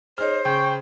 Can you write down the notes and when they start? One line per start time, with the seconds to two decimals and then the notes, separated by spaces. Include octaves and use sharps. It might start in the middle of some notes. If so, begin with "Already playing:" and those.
0.18 D#4 G#4 C5 C#5 F6
0.45 C#3 G5 C#6